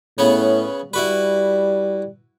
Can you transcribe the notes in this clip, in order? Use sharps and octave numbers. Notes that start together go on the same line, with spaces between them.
A2 C#3 B3 C#4
G3 E4 F#4 B4